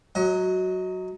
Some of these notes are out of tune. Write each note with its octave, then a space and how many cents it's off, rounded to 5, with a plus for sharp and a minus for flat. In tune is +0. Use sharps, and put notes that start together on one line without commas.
F#3 +0 D#5 +30